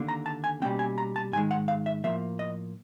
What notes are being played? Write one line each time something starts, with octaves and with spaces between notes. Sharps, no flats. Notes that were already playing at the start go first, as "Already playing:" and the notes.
Already playing: D#2 D3 A#3
A#5
A5
G#5
B2 G3 A#3 C#4 G5
G#5
A#5
A5
G#2 D#3 G#3 G#5
F#5
F5
E5
A2 F3 A#3 E5
D#5